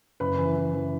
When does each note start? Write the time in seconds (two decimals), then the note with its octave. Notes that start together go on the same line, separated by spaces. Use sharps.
0.20 F#1 B4 B5
0.39 E3
0.56 E3
0.74 E3